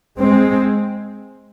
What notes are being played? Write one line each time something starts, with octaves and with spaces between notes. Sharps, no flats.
G#3 C4